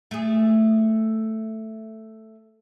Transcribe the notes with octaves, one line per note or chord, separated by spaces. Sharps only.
A3 G#4